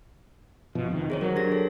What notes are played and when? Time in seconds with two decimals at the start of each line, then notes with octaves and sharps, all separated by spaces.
0.75 G1 B2 F3
0.90 F1 C3 D#3
1.10 D#3 G#4 C5 C#5
1.21 F#3 A#4
1.36 D4 G4 A#6
1.52 A4